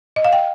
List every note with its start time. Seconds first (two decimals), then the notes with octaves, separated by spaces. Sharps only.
0.16 D#5
0.24 F5
0.33 G5